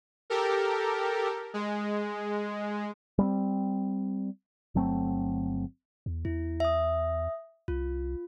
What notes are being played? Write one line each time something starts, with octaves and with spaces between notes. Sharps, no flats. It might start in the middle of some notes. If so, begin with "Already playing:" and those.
G4 A4 A#4
G#3
G3 B3 C4
G1 F#3 A3 C4
E2
E2 E4
E5 D#6
C2 F4